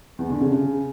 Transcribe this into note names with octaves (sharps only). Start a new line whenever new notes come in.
E2
D3
C#3
C#3